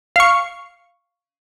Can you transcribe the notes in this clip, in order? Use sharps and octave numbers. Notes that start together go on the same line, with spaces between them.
F5 C#6